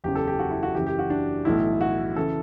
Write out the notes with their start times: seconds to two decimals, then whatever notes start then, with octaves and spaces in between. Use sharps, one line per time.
0.04 F#1 E2 C#3 G4
0.15 A4
0.27 G4
0.39 F#4
0.51 E4
0.63 F#4
0.75 F#1 F#2 E3 G4
0.87 G4
0.99 F#4
1.10 D4
1.45 B1 A2 E3 E4
1.81 F#4
2.16 C#3 E3 A4